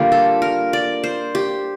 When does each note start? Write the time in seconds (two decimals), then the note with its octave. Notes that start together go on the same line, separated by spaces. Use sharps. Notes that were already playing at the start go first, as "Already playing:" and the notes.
Already playing: D3 G3 A#3 F4 G4
0.12 A4
0.42 A#4
0.73 D5
1.04 C5
1.35 G4